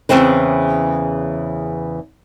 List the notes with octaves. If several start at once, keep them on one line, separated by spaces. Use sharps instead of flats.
E2 G2 C#3 E3 C4 B4